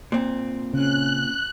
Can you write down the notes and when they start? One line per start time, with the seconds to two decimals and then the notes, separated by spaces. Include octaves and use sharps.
0.12 A#2 C4
0.73 C#3 C#4 F#6